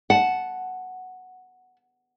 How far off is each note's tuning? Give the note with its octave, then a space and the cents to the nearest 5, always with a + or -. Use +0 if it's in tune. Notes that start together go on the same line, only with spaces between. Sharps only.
F#5 +0 A5 -10